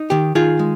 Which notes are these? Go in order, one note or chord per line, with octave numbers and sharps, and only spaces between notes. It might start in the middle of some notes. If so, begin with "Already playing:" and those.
Already playing: D#4
D#3 G4
D#3 F4 G#4
G#3